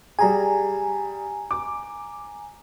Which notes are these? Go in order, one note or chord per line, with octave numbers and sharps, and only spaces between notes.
G3 G#4 G#5 A#5
D6